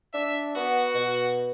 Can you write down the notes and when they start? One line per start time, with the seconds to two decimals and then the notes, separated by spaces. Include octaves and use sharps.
0.14 D4 E5
0.56 B3 F#4
0.95 B2